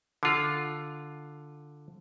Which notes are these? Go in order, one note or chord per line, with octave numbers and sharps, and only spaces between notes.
D3 F4